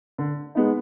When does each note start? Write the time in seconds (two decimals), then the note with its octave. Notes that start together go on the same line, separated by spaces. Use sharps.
0.18 D3
0.55 G#3 B3 D#4